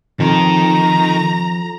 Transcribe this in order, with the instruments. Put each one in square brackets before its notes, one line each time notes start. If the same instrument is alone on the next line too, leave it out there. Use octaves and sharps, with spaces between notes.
[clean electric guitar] F2 [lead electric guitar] D#3 [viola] A#5